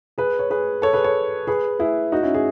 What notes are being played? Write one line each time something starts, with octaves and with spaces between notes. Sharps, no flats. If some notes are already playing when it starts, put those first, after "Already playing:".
G#4 B4
C#5
G#4 B4
A4 C#5
G#4 B4
A4 C#5
G#4 B4
E4 G#4
D#4 F#4
C#4 E4
E4 G#4